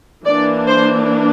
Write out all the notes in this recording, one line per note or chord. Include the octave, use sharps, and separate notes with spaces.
E3 A#3 D4 D5
C5